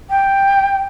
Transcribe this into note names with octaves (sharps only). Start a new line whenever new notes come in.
G5